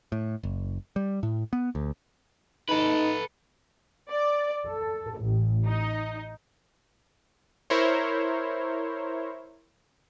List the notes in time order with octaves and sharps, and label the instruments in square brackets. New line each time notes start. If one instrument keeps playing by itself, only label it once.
[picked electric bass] A2
F#1
G3
A2
B3
D2
[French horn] D#4 [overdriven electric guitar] A4 B4
[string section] D5
A4
A1
D#4
[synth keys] E4 A#4 C5 C#5